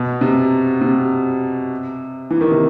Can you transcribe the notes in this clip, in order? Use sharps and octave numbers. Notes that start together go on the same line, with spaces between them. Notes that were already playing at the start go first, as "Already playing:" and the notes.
Already playing: B2
C3
C3
E3
D#3
C3